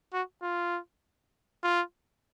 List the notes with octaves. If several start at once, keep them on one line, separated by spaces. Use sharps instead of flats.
F#4
F4
F4